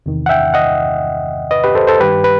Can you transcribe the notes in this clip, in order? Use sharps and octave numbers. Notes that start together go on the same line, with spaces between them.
E2 C3 D#3
F#5
E5 G5
D#5 F#5
B4 D#5
G4 B4
A4 C5
A4 C5
G2 D#3 G3 G4 B4
B4